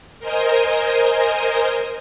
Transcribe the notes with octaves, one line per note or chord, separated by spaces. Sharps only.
A#4 C5 D#5 G#5